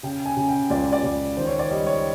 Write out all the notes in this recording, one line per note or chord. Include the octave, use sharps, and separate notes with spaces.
C#3 G5
G#5
C#3
G5
C#2 D5
D5
C#2
D#3 C5
C#5
D5
G3 D#5
C#5